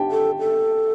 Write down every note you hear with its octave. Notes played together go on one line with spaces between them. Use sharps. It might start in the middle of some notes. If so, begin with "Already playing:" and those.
Already playing: G4 G5 A5
A4
A4